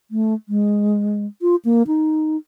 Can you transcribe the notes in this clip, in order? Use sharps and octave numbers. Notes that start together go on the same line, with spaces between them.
A3
G#3
F4
A#3
D#4